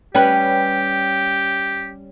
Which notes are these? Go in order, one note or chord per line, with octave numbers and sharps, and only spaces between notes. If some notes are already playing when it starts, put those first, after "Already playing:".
G3 C#4 G4 B4 G5